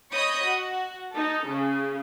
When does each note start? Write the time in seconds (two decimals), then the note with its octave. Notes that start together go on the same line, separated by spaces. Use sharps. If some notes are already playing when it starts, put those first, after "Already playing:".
0.12 C#5 D#5 B5 C#6 D#6 G6
0.45 F#4
1.13 D#4 A4
1.46 C#3